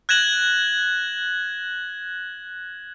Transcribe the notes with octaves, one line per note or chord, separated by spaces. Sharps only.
F#6 G#6 A#6 E7 F#7